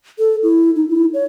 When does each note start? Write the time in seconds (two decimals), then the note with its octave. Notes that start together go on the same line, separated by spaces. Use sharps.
0.19 A4
0.43 E4
0.76 D#4
0.89 E4
1.14 C#5